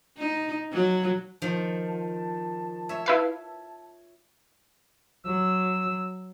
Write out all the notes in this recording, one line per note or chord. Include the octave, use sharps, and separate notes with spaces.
D#4
F#3
D#3 F3 F4 A5
C#5 E5
E4 B4 F5
F#3 E6